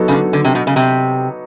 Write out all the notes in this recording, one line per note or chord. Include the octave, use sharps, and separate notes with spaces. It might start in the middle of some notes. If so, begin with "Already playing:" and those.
Already playing: F#3 B3 D#4 F#4 A4
C#3
D3
D3
C3
B2
C#3
C3